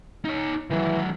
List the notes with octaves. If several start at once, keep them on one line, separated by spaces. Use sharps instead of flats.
D#4 C#5
D#3 E3 F#3